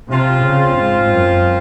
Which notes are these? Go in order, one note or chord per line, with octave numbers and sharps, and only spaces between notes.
C3 F3 C4 F4
C#3
G#2
F#2